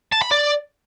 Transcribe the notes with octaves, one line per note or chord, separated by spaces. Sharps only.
A5
B5
D5